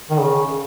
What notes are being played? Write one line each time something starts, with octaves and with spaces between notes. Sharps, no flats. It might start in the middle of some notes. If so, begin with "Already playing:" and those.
D#3
C#3